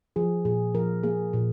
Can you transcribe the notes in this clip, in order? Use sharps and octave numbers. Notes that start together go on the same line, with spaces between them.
F3 G#4
A#2 G#4
F3 A#4
A#3 G#4
A#2